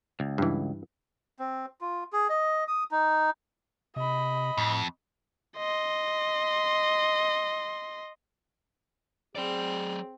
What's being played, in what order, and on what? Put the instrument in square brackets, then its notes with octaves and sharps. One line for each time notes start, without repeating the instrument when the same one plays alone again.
[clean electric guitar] C#2
[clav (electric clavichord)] G2 E3
[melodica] C4
F4
G#4
D#5
D#6
D#4
[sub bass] C3 [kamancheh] D#5 B5
[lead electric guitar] F2 [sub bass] A2
[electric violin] D#5 C6
[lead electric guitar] F#3 D5 [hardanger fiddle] C4 [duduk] G#4